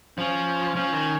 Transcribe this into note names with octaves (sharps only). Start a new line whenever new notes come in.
F3 C#4
F3 C#4
D#3